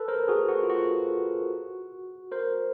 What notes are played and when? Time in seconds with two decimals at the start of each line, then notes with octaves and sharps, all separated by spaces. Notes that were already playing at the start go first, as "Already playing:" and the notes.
Already playing: A4 B4
0.08 A#4 C5
0.28 F#4 G#4
0.49 F#4
0.64 F4
0.70 F#4
2.31 A#4 C5